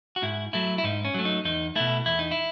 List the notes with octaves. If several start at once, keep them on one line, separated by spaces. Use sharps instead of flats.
F#4
G#2 E4
F#3 A3 E4
E4
G#2 D#4
C#4
F#3 A3
D#4
E2 D#4
B2 A3 E4
E2 E4
D#4
E4